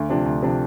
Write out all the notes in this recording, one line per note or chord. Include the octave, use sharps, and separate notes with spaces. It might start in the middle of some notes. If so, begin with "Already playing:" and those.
Already playing: D2
C3 F3 D4
D2
C3 F3 D4